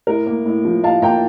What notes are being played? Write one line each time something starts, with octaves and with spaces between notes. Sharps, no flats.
A2 A#4
A#3
A2
F3
A2 F5 A5
A#3 G5 A#5